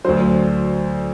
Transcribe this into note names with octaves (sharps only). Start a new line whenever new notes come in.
D2 D3 F#3 C5